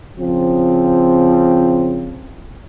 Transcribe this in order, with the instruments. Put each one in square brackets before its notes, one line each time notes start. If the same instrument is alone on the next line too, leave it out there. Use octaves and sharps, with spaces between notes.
[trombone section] C#3 F3 C4